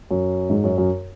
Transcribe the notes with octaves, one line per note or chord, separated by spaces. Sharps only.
F#2
G#2
F#2
F#2